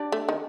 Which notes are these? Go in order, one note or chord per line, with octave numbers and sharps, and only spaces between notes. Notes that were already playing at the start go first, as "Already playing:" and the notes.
Already playing: D4 G4 D5
A3
D#3